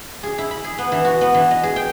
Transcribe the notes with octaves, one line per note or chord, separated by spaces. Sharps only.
G#4
E4
B5
G#4
B3
E3
F#4
B3
E3
D#5
G#4
G5